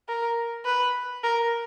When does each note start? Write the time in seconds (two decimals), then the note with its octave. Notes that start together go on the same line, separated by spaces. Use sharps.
0.08 A#4
0.66 B4
1.23 A#4